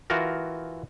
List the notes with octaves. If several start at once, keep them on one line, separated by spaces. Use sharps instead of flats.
E3 F4 F#4 A#4